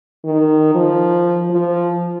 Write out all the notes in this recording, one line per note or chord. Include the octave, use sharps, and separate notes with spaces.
D#3
F3
F3